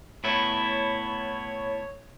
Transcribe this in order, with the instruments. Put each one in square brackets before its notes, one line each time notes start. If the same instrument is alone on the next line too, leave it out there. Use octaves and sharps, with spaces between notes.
[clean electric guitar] A2 B3 E4 [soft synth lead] C#5